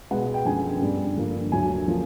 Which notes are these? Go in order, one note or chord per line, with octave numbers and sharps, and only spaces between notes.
B2 G#3 B3 F#5
G5
F#2 D3 F3 G#3 B3 G#5
G2 D3 G3
G2 D3 F3 A#3
D2 D3 F#3 G#5
C#3 F3 A#3